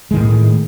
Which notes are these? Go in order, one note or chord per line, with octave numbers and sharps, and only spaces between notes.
A2 D#3 G#3